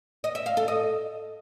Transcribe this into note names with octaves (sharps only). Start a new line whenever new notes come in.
D#5
E5
F5
A4
D#5